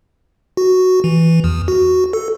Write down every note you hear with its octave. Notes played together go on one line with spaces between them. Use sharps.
F#4
E3
E2
F#4
A4